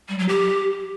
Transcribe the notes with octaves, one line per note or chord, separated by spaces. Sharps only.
G3
F#3
G4